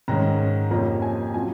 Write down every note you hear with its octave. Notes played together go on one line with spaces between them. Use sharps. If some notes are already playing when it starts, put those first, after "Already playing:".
G#2 D#3 G#3 C#4 A#5
F2 C3 F3 A#3 C#4 A#5
G#5
C3 F#3 C#4 F4 G#5